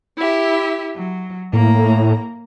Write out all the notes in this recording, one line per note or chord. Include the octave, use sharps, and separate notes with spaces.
E4 G4 E5
F#3
A2 A#3 A#5